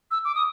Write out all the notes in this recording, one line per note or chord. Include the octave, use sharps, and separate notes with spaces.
E6
D6
D#6